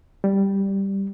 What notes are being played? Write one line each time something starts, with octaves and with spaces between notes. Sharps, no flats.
G3